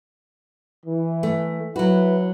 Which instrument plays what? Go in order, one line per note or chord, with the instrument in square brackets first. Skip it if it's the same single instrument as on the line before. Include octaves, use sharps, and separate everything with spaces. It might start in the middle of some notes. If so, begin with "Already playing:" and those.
[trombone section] E3
[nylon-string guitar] A3
[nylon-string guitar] F#3 F#4 [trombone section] E4 B4